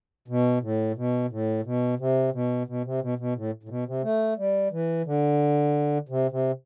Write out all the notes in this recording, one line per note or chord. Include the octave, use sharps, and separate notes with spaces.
B2
A2
B2
A2
B2
C3
B2
B2
C3
B2
B2
A2
A2
B2
C3
A3
G3
E3
D3
C3
C3